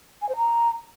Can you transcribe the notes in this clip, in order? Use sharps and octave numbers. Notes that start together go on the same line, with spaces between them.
G#5
C5
A#5